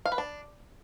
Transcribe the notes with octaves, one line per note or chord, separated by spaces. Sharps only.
F5
B4
D4